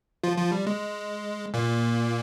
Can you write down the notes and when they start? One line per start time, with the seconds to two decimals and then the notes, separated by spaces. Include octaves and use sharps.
0.23 F3 F4
0.38 F3 F4
0.52 G3
0.67 G#3
1.54 A#2 A#3